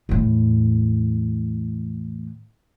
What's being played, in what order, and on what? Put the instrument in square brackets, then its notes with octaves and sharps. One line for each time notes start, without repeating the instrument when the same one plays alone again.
[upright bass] E2 A2